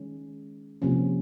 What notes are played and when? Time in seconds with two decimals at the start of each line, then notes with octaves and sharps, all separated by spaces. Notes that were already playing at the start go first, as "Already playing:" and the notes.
Already playing: D#3 G#3 C#4
0.82 C3 F3 A#3 C#4